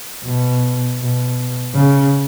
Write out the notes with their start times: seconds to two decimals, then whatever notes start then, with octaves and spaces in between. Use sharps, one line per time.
0.25 B2
1.00 B2
1.75 C#3